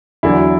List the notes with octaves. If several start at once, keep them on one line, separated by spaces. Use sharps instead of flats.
E2 D3 F#3 E4